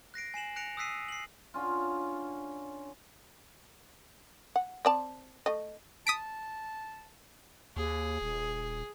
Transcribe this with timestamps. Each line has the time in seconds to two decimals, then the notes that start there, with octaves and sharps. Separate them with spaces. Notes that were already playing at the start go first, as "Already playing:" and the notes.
0.14 F#6 A#6 C7 D7
0.34 G#5 C7 E7 F#7
0.56 F#6 A#6 C#7 D7 F7
0.77 D#6 E6 F#6 B6 C7 D#7
1.09 C7 F#7
1.54 D3 C#4 F4
4.56 F#5
4.85 C4 D5 A5
5.46 A3 D#5
6.07 A5 D#6 B6 D7
7.77 D#2 G#4
8.22 D#1